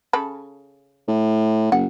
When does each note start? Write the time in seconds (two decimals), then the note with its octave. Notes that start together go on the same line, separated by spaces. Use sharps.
0.13 C#3 A4 B5
1.08 A2
1.72 F#1 F#5